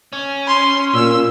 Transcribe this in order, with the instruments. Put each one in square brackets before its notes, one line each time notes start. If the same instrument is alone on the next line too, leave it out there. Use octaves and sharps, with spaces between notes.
[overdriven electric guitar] C#4
[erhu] C6
[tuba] A#2 [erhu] E6